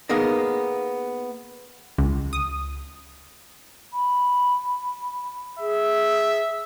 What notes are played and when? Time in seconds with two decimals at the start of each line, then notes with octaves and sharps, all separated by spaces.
0.09 A#3 B3 D#4 G#4 A#4
1.98 C#2
2.33 D#6
3.92 B5
5.59 G#4 E5